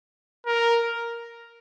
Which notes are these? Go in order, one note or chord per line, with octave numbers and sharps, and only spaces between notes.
A#4